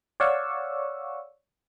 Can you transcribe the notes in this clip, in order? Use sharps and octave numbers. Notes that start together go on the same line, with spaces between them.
C#5 D5 F5 F#5 C#6 E6